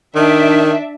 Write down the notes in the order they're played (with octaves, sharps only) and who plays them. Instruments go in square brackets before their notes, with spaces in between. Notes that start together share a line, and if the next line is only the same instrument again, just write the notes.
[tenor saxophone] D#3 [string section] D4 E5